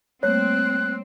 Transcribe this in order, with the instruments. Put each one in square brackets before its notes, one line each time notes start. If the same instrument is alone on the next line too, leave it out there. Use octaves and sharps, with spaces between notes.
[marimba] G3 A3 A#3 [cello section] C4 [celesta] C#5 [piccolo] F#6